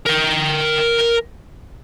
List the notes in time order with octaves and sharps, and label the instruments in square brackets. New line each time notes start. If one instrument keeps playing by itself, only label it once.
[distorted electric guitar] A#4 G5